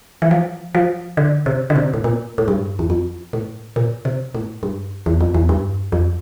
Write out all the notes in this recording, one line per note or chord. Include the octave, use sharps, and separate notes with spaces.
E3
F3
F3
D3
C3
D3
C3
A2
A#2
A2
G2
E2
F2
A2
A#2
C3
A2
G2
E2
F2
E2
G2
F2